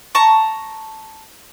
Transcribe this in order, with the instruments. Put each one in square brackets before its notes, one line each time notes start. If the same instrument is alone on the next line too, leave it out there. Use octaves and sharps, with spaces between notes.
[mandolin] A5 A#5 C#6